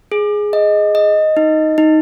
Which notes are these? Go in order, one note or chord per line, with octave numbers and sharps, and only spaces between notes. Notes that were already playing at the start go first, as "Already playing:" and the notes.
G#4
D#5
D#5
D#4
D#4